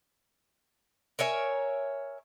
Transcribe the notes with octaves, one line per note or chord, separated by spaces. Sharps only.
A#4 C#5 E5 G#5